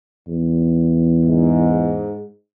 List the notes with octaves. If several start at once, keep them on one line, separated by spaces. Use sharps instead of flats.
E2
G#2